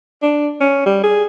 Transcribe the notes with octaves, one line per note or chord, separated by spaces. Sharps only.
D4
C#4
G3
G#4